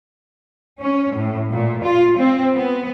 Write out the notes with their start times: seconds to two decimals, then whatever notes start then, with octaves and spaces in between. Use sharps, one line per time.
0.81 C#4
1.16 A2
1.50 A#2
1.84 F4
2.18 C4
2.55 B3